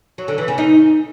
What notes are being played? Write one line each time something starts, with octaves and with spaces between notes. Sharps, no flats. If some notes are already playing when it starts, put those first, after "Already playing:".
F#3
D3
E3
C#3
D#4